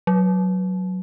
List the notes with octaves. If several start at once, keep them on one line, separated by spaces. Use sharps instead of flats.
F#3